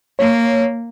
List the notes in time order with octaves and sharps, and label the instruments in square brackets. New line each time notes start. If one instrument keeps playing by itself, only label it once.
[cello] A#3 [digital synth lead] C#5